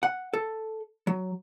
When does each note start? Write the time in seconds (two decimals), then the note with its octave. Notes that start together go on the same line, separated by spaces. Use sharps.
0.03 F#5
0.33 A4
1.07 F#3